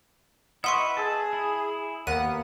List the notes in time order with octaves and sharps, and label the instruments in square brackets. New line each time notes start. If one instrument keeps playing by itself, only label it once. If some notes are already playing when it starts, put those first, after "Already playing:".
[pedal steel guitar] E4 B4 E5 [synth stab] D#5 [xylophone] F#5 C6 C#6
[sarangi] G#4 [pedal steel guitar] A5 E6
[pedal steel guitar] E4
[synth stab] D#2 F#5 [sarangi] A#3 [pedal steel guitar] B3 [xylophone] D#7